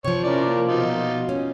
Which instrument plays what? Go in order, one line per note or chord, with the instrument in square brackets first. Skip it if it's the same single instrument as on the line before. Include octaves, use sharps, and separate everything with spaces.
[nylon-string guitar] C3 F3 [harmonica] C#5
[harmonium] C#4 E4 [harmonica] A#4 D5
[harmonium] A#3
[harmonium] B2 [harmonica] D#4 F4
[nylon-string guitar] C#4